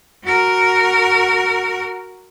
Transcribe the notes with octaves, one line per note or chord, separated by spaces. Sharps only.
F#4 A#4